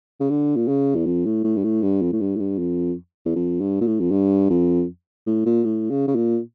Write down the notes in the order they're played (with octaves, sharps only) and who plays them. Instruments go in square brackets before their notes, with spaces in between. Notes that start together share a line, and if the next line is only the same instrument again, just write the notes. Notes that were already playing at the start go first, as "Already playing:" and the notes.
[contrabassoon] C#3
D3
A#2
C#3
E2
F2
A2
A2
G2
A2
G2
F2
A2
G2
A2
G2
F2
E2
F2
G2
A#2
A2
F2
G2
F2
A2
A#2
A2
C#3
C#3
A#2